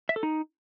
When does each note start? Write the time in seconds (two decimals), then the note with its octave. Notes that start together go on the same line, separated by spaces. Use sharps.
0.09 E5
0.16 A4
0.23 D#4